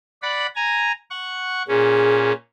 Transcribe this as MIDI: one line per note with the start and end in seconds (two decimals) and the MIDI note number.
0.22 0.47 74
0.22 0.47 78
0.22 0.47 83
0.56 0.92 80
0.56 0.92 82
1.10 1.63 78
1.10 1.63 85
1.68 2.32 46
1.68 2.32 61
1.68 2.33 68